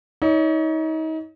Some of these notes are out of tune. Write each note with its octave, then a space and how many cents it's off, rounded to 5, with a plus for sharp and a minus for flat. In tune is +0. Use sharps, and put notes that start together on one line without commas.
D#4 +35 C#5 +35